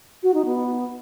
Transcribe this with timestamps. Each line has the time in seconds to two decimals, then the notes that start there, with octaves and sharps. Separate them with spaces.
0.23 F#4
0.34 D#4
0.45 B3